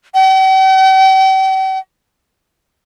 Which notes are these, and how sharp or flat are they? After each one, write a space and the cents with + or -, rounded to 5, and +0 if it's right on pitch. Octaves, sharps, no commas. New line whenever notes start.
G5 -45